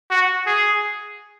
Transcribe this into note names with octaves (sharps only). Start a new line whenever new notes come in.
F#4
G#4